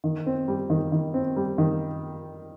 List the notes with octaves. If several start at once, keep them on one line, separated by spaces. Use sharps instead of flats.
D#3
C4
G3
D#3
D#3
C4
G3
D#3